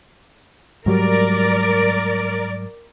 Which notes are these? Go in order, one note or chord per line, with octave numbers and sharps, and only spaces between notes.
G#2 F#3 G3 A#4 D5